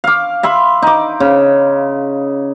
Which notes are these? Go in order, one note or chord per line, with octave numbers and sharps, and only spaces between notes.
F5 D6
E5 B5 C6
D#4 D6
C#3